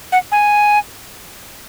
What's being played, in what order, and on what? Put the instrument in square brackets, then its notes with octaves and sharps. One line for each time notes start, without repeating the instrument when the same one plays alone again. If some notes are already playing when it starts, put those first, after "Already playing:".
[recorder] F#5
G#5